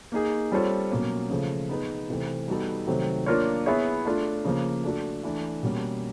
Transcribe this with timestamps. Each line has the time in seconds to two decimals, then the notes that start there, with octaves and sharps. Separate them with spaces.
0.12 A#3 D#4 G#4
0.52 G3 C4 F4 A4 C#5
0.91 B2 F#3 A#3 C#4
1.30 C#3 F3 A3
1.69 B3 D#4 G#4 B4
2.09 C3 E3 A3 C4
2.48 G3 B3 D#4 F#4 A4
2.87 C3 D#3 F#3 A3 C4
3.26 A#3 D4 F4 A#4 C#5
3.66 B3 E4 G#4 C#5 E5
4.06 A3 D4 F4
4.45 C#3 F3 A#3
4.84 A3 D4 F#4 A4
5.23 E3 A3 D4
5.63 B2 G3 A#3 C#4